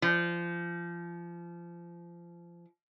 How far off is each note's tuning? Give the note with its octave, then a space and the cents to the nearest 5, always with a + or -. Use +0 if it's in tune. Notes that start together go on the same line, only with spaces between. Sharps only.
F3 -25